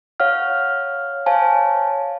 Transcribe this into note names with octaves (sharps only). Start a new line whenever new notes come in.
C#5 F5 F#5 F6
C5 C#5 F5 G#5 A5